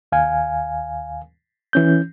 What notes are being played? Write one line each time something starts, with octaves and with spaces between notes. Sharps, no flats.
D#2 F5 G#5
E3 C#4 G6